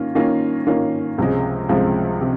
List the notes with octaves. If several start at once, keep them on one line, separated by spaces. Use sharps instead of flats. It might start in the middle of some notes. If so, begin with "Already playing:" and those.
Already playing: D#3 A#3 C#4 F4
D#3 A#3 C#4 F4
D#3 A#3 C#4 F4
C#2 C3 F3 G#3
C#2 C3 F3 G#3
C3